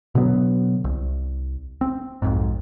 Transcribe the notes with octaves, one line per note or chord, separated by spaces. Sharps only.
B2 D3 F#3 B3
C2
C4
B1 F2 G#2